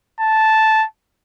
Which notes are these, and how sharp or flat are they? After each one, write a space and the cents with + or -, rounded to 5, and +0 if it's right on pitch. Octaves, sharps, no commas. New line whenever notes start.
A5 -5